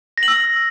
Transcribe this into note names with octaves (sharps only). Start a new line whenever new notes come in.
A#6
F#7
E6